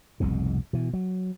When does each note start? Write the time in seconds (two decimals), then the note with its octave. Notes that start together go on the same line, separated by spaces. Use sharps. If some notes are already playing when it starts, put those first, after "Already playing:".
0.20 F1 C2 G#2 B2
0.73 B2 E3
0.93 F#3